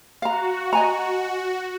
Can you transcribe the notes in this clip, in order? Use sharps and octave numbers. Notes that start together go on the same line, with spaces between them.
F#4 F5 A#5
D#5 G#5 A#5